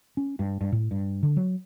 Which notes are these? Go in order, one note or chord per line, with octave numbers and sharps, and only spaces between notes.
C#4
G2
G2
A2
G2
D3
F#3